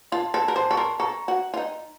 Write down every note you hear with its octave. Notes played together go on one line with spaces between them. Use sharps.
F4 A5 C6
A4 A5 C6
A#4
C5 A5 C6
A4 C#6
A#4 A5 C6
A4 A#5 C#6
F#4
F4
D#4